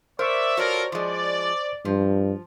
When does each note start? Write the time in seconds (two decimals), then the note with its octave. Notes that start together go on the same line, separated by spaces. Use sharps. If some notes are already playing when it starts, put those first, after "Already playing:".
0.19 A#4 C5 D5 E5 C#6
0.57 F4 F#4 A4 A#4 C#5 D5
0.92 F3 G#3 D5
1.85 G2 F3